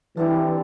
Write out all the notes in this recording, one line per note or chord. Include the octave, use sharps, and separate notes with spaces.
D3 E3 G3 C4 D#4